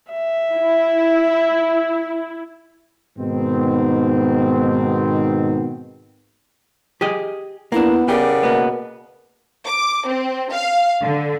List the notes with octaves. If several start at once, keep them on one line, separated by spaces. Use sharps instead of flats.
E5
E4
G#2 B2 D#3 B3 C4
G4 G#4 D#5
A#3 B3 D4 E4
C#3 G4 A#4 D5 F#5
B2 A#3 B3
D6
C4
F5
D3